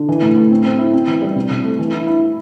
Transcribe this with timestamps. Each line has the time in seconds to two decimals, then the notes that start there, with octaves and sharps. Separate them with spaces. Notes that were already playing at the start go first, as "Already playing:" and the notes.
Already playing: D3
0.09 E3
0.22 A2
0.36 A2
0.51 C4
0.65 C4
0.79 E4
0.93 C4
1.07 E3
1.22 G3
1.35 C3
1.50 C3
1.64 A3
1.79 E3
1.92 E4
2.07 E4